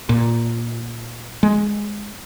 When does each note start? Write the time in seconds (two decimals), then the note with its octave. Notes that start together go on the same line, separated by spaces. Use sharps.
0.09 A#2
1.43 G#3